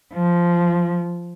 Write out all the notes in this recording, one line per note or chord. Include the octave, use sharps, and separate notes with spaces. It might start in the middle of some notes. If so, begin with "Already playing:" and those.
F3